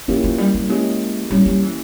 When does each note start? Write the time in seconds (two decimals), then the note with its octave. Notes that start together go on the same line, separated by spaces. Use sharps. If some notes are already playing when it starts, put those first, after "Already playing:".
0.08 F3 A#3 C#4 E4 G4
0.24 F3
0.38 G3
0.54 G3
0.69 G#3 A#3 C#4 E4 G4
1.31 G3 A#3 C#4 E4 G4
1.46 G3
1.62 E3